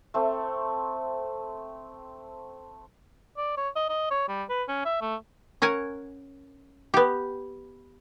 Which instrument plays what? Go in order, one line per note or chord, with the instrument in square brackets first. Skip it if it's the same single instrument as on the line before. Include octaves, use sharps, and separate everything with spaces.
[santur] A3 C4
[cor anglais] D5
C#5
D#5
D#5
C#5
G3
B4
C#4
E5
A3
[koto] C#4 A#4 F#5 G#5
B3 G4